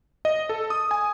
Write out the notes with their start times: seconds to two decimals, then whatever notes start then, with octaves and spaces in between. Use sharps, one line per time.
0.25 D#5
0.49 A4
0.70 D#6
0.91 G#5